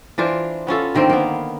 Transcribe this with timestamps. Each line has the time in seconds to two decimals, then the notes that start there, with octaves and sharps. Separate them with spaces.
0.18 E3 D4 F4 C5
0.67 B3 C#4 F4 A4
0.95 D3 D#3 A#3 C4
1.09 A#3 B3